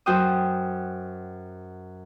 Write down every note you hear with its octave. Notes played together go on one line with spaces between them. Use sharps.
F#2 F#4 C5 G5 D#6